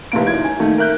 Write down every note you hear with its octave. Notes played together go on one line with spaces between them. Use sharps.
F1 C2 A#2 D7
F#2 D#4 E4 G#6
G#5
A#2 D#3 A3
A#4 E5 F#6 G6